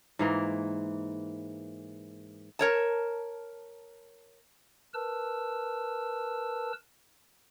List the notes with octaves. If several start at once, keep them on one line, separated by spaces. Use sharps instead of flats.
G#2 E3 A#3
A#4 C#5 A5
A#4 B4 A5 E6